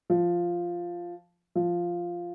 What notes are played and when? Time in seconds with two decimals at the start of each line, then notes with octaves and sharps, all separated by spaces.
0.10 F3
1.55 F3